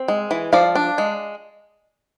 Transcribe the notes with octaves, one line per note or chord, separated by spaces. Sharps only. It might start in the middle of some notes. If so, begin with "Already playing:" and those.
Already playing: C4
G#3
E3
F3 D5 F5
D4
G#3